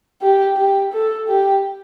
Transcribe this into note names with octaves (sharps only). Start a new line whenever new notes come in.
G4
G4
A4
G4